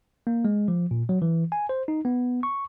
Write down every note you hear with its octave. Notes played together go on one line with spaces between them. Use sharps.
A#3
G#3
F3
A#2
F#3
E3
G#5
C5
D#4
B3
C#6